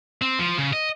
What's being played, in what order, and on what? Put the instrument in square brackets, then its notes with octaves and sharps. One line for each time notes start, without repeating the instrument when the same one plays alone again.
[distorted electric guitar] C4
F3
C#3
D#5